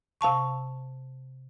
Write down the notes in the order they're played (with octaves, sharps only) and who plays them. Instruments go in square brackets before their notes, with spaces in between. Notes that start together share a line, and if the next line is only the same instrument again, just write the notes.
[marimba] C3 F5 A5 C#6